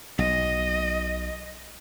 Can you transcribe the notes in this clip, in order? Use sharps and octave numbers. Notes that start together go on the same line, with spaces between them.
B1 D#5